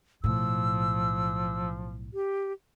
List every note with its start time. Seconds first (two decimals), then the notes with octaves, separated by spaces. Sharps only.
0.24 B1 A2 F3 E6
2.14 G4